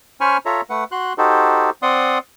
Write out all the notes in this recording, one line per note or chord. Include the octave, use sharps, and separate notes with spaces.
C#4 C5 G#5 B5 C#6 F6
F4 A4 C#5 E5 A#5
A3 B4 F#5
F#4 C6 F#6
D#4 F#4 G4 A4 C5
C4 D5 F#5 C6 D#6